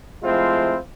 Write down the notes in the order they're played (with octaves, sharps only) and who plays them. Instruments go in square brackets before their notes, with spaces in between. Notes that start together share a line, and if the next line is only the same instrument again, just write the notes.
[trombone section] F3 G#3 A3 C4 E4 F4